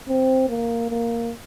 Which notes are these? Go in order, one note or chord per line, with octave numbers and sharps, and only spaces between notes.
C4
A#3
A#3